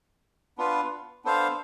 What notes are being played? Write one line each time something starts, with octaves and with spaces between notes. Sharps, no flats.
B3 D4 F4 B4
B3 D4 A4 C5 F5